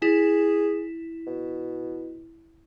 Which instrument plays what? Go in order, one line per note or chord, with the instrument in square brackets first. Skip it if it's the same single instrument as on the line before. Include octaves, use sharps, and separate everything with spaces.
[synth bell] E4 [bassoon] G#4
[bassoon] B2